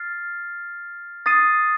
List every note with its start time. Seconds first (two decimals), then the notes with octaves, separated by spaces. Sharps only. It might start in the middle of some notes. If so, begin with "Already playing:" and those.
Already playing: F6 A6 C7
1.26 D#6 A6 C7 D#7